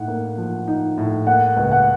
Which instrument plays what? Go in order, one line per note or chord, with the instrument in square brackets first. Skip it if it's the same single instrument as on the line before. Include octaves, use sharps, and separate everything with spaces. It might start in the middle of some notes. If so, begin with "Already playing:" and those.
Already playing: [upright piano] A2 D#4 [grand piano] F#5
[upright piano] A#3
F3
D#4
A2
[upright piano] A#3 [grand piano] F#5
[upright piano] C#2
[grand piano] F#5